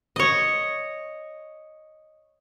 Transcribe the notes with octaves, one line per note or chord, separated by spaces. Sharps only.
C#5 D#5